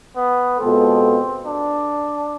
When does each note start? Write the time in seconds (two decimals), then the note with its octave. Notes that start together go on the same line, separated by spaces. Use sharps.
0.17 B3
0.59 B2 G#3 B3 C4 F4 A4
1.46 D4